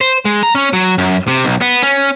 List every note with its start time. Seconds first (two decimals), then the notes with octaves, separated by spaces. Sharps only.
0.01 C5
0.25 G#3
0.43 A#5
0.55 C#4
0.73 F#3
0.98 F#2
1.28 C3
1.45 B1
1.61 B3
1.83 C#4